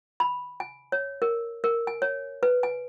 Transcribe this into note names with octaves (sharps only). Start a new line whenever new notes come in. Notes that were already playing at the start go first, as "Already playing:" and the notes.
B5
G#5
C#5
A#4
A#4
G#5
C#5
B4
G#5